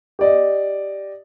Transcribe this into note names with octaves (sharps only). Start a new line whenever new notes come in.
G4 D5 D#5